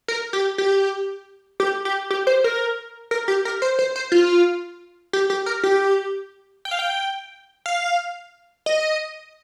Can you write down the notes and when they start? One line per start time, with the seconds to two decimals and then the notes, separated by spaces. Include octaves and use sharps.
0.08 A#4
0.33 G4
0.58 G4
1.60 G4
1.85 G4
2.10 G4
2.27 C5
2.44 A#4
3.11 A#4
3.28 G4
3.45 A#4
3.62 C5
3.79 C5
3.96 C5
4.12 F4
5.13 G4
5.30 G4
5.46 A#4
5.63 G4
6.65 G5
6.71 F5
6.79 G5
7.66 F5
8.66 D#5